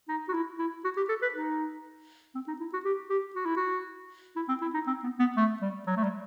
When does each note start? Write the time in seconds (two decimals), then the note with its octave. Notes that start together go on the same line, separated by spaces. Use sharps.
0.09 D#4
0.29 F#4
0.34 E4
0.59 E4
0.84 F#4
0.97 G4
1.09 A4
1.22 B4
1.34 D#4
2.35 C4
2.48 D#4
2.60 E4
2.73 F#4
2.85 G4
3.10 G4
3.36 F#4
3.46 E4
3.57 F#4
4.36 E4
4.49 C4
4.62 E4
4.74 D#4
4.87 C4
5.03 B3
5.20 B3
5.37 A3
5.62 G3
5.87 F#3
5.97 A3
6.04 G3